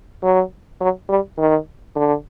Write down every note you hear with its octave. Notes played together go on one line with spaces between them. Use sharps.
F#3
F#3
G3
D#3
D3